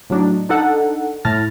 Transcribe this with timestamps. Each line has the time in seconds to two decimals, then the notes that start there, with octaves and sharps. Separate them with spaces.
0.10 A2 F#3 D4 D#4
0.49 D4 D#4 A4 F#5
1.25 A2 A5 F6 A6 A#6